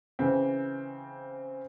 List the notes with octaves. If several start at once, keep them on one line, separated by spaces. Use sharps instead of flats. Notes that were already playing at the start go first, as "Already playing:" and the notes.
C#3 E3 C4